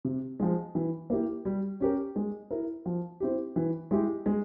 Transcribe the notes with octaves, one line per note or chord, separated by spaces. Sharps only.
C3
F3 G#3
E3
A#3 E4 G4
G3
C#4 G4 A#4
G#3
E4 A#4
F3
C4 E4 G4
E3
G#3 E4 G4
G#3